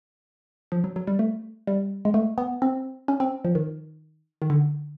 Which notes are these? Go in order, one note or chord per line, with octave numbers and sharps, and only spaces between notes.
F3
F#3
F#3
G3
A3
G3
G#3
A3
B3
C4
C#4
C4
F3
D#3
D#3
D3